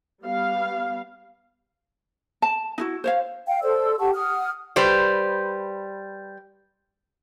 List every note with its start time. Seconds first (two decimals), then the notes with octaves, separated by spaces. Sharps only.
0.24 G3 B3 F5
2.42 A5
2.78 D#4 E4 F#4
3.04 C5 C#5 F5
3.47 F5 G5
3.62 A4 C5 D5 E6
3.99 G4 F#5 A5 C#6
4.13 F#5 D#6 F6
4.76 G3 B4 C5 D5